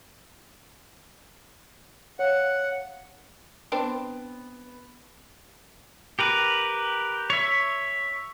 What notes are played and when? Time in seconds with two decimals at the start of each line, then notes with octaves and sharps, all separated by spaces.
2.19 C#5 F5 F#5
3.72 B3 C4 D4
6.19 G4 A#4 B4
7.30 C#5 E5